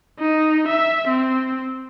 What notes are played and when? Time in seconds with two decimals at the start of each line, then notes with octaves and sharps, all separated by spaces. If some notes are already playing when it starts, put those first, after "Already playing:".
0.19 D#4
0.68 E5
1.08 C4